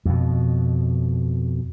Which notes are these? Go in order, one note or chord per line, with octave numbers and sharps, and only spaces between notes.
F2 B2